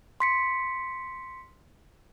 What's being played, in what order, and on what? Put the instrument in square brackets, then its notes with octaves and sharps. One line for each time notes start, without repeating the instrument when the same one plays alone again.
[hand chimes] C6 B6 C#7